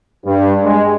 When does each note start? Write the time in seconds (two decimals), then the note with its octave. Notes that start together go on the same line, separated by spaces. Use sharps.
0.25 G2
0.63 G#3